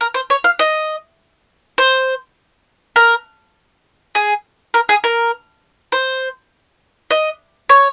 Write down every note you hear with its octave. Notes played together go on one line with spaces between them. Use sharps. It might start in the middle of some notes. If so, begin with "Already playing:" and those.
A#4
C5
C#5
F5
D#5
C5
A#4
G#4
A#4
G#4
A#4
C5
D#5
C#5